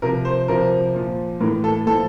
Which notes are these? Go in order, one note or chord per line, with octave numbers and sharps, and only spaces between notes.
C3 F3 A#4
C5
C3 F3 A#4
A#2 F3
A2 E3 A#4
A4
A2 F3 A4